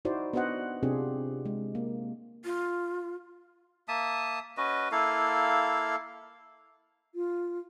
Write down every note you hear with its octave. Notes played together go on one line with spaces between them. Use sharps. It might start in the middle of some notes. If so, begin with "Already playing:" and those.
D#4 E4 F#4 C5 D5
B3 D4 F#4 C5 D#5 F#5
C3 C4 D4 F4 G4 G#4
G#3
A#3
F4
A#3 E5 A5 D#6
C#4 F#4 B4 D#5
A#3 E4 A4 F5
F4